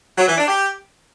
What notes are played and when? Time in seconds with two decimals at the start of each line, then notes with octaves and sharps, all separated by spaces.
0.18 F#3
0.28 E3
0.37 D4
0.47 G4